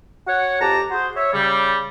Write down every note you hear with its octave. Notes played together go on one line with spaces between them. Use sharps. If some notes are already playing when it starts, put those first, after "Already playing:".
F#4 C#5 F#5
F2 G4 A5 A#5
F#4 G#4 C5
C#5 E5
C#3 G3